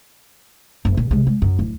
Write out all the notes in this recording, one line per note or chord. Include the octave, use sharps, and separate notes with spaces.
F#1
A#2
C3 G#3
G#3
F#2
D1